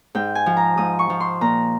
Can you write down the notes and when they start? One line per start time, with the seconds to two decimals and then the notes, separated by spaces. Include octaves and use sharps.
0.15 G#2 G5
0.35 G#5
0.46 F3
0.57 A#5
0.77 G#2 D#6
0.99 C#6
1.10 F3
1.20 C6
1.41 A#2 A#5